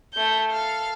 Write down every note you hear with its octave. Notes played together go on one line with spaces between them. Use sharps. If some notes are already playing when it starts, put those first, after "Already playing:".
A3 G6
A4 F5